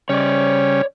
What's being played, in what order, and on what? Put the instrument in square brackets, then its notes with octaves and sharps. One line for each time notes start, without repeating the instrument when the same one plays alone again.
[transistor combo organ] C#3 G3 C#4 [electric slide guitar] C#5 D5